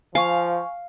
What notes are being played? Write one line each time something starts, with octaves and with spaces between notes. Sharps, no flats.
F3 F5 G#5 C#6